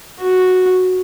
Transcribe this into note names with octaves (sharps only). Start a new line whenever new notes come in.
F#4